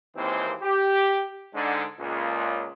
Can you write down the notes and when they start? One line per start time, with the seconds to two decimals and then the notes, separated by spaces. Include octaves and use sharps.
0.16 G#1 D#2 E3 A#3 C4 C5
0.63 G4
1.54 G#2 D3
2.00 C#2 A#2